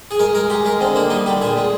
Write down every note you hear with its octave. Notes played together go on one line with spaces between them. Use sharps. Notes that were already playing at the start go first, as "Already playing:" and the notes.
G#4
G#3 A#4
G#3 A#4
G#3 G4
G#3 A#4
D3 C4
A#3 D4
G3 D#4
D3 G4
A#2 G#4
G#3